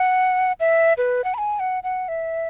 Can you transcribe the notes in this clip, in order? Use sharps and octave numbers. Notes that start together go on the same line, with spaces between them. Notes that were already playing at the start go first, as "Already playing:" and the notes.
Already playing: F#5
E5
B4
F#5
B5
G#5
F#5
F#5
E5